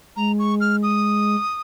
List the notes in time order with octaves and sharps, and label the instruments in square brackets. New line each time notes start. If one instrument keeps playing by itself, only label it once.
[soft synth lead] G#3 [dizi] A#5
[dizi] C#6
F6
D#6